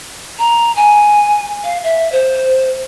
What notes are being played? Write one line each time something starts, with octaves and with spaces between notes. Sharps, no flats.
A#5
G#5
F5
E5
C5